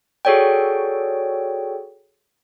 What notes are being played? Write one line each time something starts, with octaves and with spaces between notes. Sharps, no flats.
F#4 G#4 A4 C#5 D5 G5